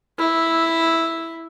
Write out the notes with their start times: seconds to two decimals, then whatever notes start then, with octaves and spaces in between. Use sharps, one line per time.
0.18 E4